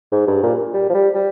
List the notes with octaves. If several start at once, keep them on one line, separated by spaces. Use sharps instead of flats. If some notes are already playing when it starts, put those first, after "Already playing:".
G#2
G2
A#2
G3
F3
G3
G3